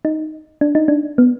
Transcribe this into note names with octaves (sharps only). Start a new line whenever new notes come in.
D#4
D4
D#4
D4
B3